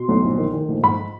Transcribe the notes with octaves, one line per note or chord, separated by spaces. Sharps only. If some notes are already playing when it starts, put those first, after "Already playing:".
Already playing: B2 C6
B1
A#1
D#3
D#3
A#1
G#2 B5